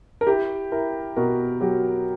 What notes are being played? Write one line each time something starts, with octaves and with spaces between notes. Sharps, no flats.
A#4
E4 G4
E4 A#4
B2 A#4
F#3 G4